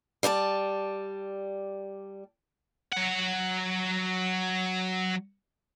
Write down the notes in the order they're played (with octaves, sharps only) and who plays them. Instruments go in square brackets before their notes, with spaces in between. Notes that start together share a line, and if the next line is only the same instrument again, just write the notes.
[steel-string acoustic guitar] G3 D5 G#5 A5
[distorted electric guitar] F#3 F#5